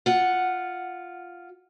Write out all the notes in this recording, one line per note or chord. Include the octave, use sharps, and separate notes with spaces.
F4 F#5